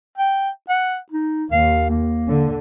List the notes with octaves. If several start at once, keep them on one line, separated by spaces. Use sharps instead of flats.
G5
F#5
D#4
D#2 F5
A#3
D3